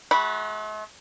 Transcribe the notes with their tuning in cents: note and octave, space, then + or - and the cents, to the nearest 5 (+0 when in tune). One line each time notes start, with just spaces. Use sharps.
A3 -45 F#4 +0 B5 -15